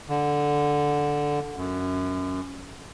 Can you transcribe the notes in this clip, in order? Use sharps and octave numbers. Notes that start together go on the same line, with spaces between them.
D3
F#2